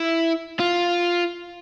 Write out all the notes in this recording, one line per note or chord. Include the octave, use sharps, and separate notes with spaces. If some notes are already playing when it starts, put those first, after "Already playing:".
Already playing: E4
F4